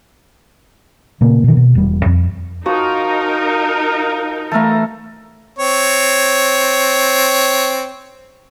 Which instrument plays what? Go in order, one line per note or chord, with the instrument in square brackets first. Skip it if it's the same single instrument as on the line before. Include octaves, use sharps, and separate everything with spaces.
[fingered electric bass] A#2 C#3 A#3
B2 D#3
B2
E1 G3
F2
[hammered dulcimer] F3 [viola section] D#4 A#4 [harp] F#4
[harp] E3 A3 [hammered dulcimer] A4 F5 A#5
[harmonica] C4 C#5